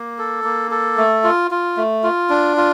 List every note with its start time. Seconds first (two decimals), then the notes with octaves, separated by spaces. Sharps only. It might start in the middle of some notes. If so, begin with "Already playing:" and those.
Already playing: A#3
0.18 A4
0.44 A#3
0.71 A4
0.98 A3
1.24 F4
1.51 F4
1.77 A3
2.04 F4
2.30 D4
2.57 F4